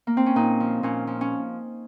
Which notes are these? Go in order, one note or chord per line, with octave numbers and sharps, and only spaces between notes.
A#3
C4
C#4
A#2 D#4
F3
A#2 C#4
F3
C#4